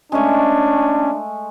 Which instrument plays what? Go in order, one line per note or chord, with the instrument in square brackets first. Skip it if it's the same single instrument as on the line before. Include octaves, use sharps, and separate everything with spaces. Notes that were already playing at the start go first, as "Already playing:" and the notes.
[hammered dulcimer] G#3 A3 [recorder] C#4 [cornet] D4